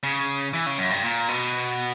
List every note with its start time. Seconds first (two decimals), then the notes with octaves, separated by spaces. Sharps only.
0.03 C#3
0.54 E3
0.66 C#3
0.78 F#2
0.91 G2
1.03 A#2
1.28 B2